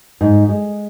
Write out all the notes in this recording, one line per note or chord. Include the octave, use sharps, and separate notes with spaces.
G#2
G#3